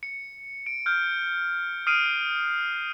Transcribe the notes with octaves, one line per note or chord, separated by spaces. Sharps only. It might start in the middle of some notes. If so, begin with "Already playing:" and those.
C#7
D7
F6 G6
D#6 F6 C7 D7 D#7